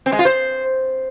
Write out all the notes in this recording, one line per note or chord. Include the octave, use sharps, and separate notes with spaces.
C4
G#3
F4
C5